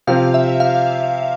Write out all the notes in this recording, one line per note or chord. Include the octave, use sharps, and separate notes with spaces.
C3 F3 C4 G4 F5
E5
F5